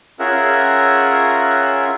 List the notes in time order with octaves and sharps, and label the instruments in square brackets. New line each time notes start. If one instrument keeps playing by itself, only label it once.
[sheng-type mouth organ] C#4 F4 G#4 A#4 E5 F#5